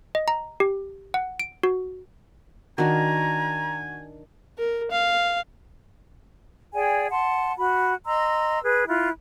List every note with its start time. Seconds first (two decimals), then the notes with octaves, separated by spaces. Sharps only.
0.15 D#5
0.28 A#5
0.60 G4
1.14 F#5
1.40 D7
1.63 F#4
2.78 D#3 D4 F#4 G#5 A#5
4.58 A#4
4.91 F5
6.74 G#4 D5 G5 G#5
7.10 F#5 A5 C6
7.57 F#4 B5
8.06 D#5 A#5 C6 E6
8.64 G#4 B4
8.88 E4 F4 F#6